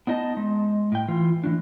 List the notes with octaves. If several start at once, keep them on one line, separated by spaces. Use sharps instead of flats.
B3 D4 D#4 D#5 A5
G#3
A2 G5
E3 F4
E3 F3 A3 D4